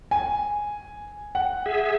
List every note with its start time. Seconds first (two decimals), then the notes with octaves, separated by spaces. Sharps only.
0.11 G#5
1.35 F#5
1.66 G#4 E5